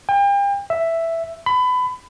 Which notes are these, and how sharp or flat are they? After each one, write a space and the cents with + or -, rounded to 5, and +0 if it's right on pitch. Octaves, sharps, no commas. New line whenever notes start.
G5 +40
E5 +5
B5 +25